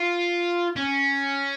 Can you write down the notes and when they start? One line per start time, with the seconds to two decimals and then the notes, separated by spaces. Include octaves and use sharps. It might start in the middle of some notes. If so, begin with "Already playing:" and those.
Already playing: F4
0.76 C#4